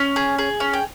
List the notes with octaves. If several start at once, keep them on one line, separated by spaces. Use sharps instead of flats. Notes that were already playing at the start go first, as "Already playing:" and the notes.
Already playing: C#4
G#4
G#4
C#4
G5